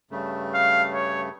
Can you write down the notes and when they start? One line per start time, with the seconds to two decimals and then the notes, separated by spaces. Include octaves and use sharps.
0.11 G2 C#3 A3
0.54 F5
0.94 C#5